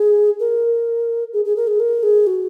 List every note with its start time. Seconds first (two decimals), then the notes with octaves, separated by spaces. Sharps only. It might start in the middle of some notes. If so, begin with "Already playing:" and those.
Already playing: G#4
0.40 A#4
1.33 G#4
1.45 G#4
1.56 A#4
1.67 G#4
1.80 A#4
2.03 G#4
2.27 F#4